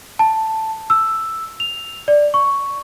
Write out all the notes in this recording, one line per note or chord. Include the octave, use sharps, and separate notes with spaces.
A5
E6
F7
D5
C#6